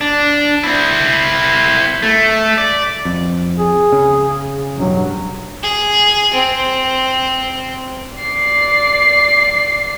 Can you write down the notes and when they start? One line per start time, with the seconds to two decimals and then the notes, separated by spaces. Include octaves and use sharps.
0.01 D4
0.64 C4 E4
2.02 A3
2.58 D5
3.05 F2
3.58 G#4
3.93 C#3
4.78 E1 G2 F#3
5.63 G#4
6.34 C4
8.16 D5 C7